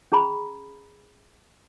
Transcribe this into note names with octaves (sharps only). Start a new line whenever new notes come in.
C#4 G#4 A#5 B5